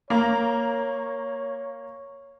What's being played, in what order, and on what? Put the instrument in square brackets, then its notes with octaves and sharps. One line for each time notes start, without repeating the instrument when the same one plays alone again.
[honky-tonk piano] A#3 A#5 [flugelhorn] C#5